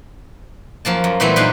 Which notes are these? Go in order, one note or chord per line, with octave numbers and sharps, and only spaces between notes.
F#2 F3 A#3 A5
F#2
A#2 E3 G3 A3 B3 C4
F#2 A#2 D4 D#4 B4 C6